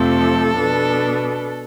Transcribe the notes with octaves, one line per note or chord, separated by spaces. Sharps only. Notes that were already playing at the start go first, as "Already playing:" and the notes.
Already playing: F2 C3 F3 A3 C4 A4
B2 B3 D4